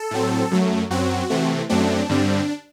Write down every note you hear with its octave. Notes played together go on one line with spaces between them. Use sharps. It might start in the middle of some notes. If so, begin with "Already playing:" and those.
Already playing: A4
A2 F#3 C4
F#2 F#3 A3
F#2 F#3 C4 F#4
C3 E3 A3 C4
F#2 F#3 A3 C4 D4
G2 D3 G3 C4